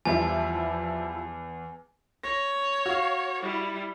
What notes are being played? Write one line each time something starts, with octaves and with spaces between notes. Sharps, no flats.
E2 F3 G3 E4 G#5
C#5 A#6
F#4 F5
G3 E4